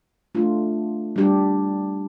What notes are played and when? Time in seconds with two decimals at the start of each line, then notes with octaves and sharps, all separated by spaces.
0.35 A3 D4 F4
1.16 G3 D4 G4